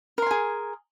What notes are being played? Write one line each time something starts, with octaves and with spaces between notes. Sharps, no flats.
G#4 A#4 G#5 C6